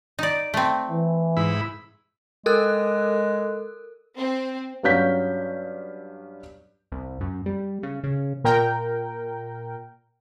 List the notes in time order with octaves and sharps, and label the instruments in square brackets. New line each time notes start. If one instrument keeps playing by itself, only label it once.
[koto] D#4 D5
A3 C4
[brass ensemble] E3
[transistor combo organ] G#2 E4 B5
[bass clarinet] G#3 [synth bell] A4 A#4 F#6
[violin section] C4
[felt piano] G2 F#3 C#4 F5 G6 B6
[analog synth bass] C2
F#2
G3
C#3
C#3
[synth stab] A#2 A#4 G5